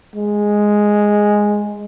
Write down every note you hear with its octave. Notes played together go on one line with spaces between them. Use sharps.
G#3